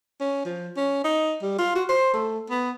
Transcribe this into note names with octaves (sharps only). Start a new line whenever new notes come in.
C#4
F3
C#4
D#4
G3
F4
F#4
C5
A3
B3